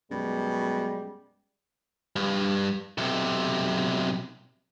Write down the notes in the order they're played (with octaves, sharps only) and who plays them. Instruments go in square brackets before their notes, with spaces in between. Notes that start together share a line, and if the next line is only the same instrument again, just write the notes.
[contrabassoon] F#2 [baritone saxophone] B2 [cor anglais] G3 [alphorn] G#3
[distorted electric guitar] G2
B1 C3